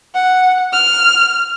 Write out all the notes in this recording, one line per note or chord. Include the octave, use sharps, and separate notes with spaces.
F#5
F6